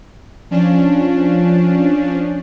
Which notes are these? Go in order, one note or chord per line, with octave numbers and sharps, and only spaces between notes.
F3 C#4 D4